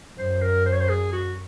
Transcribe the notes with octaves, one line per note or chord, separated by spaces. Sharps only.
F#2 C5
A#4
C5
C#5
C5
G#4
F#4